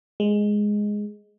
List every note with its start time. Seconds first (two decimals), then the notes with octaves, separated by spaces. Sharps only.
0.20 G#3